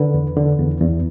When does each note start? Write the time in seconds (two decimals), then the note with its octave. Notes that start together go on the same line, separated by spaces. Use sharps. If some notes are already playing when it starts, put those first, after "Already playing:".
Already playing: D3 B4
0.14 E2
0.37 D3
0.59 E2
0.81 E2